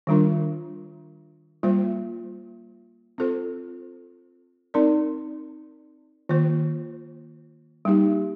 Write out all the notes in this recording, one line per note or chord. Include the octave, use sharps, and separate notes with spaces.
D#3 G3 D4 F4 A#4
G3 A#3 F4 C5
C4 F4 A4 C5
C4 D#4 A#4 D5
D#3 A#3 F4 C5
G3 A#3 D#4 G4